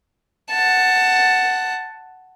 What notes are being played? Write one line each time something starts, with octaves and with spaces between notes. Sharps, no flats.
F#5 A5